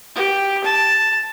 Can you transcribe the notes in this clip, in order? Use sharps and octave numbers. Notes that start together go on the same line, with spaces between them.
G4
A5